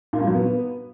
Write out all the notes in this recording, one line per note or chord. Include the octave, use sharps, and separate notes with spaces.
A#2
G2
F#3
B3